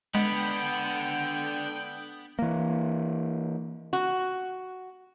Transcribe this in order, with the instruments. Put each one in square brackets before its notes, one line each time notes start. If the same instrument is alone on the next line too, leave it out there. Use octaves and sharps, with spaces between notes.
[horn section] D3 G5 [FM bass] G#3 [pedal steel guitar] B3 [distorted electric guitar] D4 F#5
[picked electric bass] E3 A#3
[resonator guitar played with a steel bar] F#4